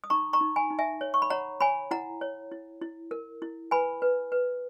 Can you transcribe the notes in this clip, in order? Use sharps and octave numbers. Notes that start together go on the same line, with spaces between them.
D#6
D#4 A#5 C#6
A#5 C#6
D#4
G#5 B5
D#4
E5 G#5
C#5
C#6
B5
C#5 F#5 A#5
C#5 G#5 B5
E4 F#5 A#5
C#5
E4
E4
A#4
E4
B4 G#5 B5
B4
B4